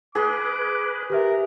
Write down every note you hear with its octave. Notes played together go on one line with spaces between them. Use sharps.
G#4 B4 D#5 D6
G4 A#4 B4 E5